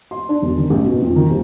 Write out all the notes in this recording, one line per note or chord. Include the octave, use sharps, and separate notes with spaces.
C6
D4
E1
D#3
A1
B2
F2
D#3
D#1